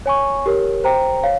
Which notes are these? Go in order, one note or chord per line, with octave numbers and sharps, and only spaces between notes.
C#5 G#5 C#6
G4 A#4 C#5
C5 G5 A#5
C#5 F5